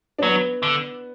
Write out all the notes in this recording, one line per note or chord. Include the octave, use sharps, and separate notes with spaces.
D4
F#3 B3
D3